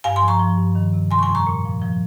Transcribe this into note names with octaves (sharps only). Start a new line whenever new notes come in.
G2 F5 G#5
G#5 C6
F3
A#5 C#6
F3
G2
D#3
C3
G3 G#5 C6
C#6
G#5 C6
F2
A#5 C#6
A#2
F3
F3